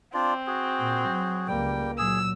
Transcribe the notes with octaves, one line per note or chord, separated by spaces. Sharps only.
C4 D4 F4 D5
F#4 G#4
A#2
F#3
C#2 G3 A#3 G5
A#2 F#3 G#4 E6